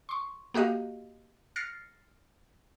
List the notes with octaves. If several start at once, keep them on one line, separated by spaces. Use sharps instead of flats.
C6 C#6
A#3 F#4 G4 D#5 F5
F6 A6 A#6 C7 C#7